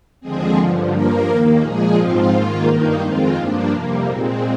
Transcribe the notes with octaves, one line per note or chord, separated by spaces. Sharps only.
D#2 D3 F3 G#3 C4 G#4
G2 D3 F3
G2 F3 A#3 A#4
D#2 D#3 A#3 A#4
A#2 F3 G#3 G#4
G#2 F3 C4 F4
G#2 D#3 A#3 F4
G2 D#3 A#3 D#4
F2 D#3 G#3 C4 F4
G2 F3 A#3 D4
F2 C3 G3 A#3
A#2 G#3 C4 D#4